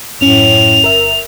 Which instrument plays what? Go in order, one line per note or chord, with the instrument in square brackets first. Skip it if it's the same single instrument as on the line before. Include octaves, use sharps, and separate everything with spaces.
[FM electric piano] F#2 C#4 [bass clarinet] A2 [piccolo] F7
[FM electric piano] G1 A#4 E5